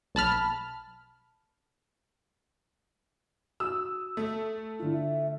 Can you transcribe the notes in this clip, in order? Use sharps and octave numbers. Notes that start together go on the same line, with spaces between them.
B1 A5 B5 F6
F#4 D#6 E6
A3
D3 E4 F4
E5